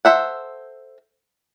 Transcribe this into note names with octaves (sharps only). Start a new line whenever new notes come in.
A4 C5 E5 F#5